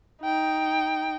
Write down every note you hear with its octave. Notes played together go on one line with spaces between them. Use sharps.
D#4 G5